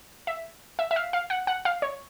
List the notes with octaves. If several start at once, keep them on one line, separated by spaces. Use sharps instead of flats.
E5
E5
E5
F5
F5
F#5
F#5
F5
C#5